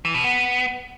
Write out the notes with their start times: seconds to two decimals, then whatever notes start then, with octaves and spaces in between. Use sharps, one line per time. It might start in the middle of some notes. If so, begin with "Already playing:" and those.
0.05 E3
0.14 B2
0.24 B3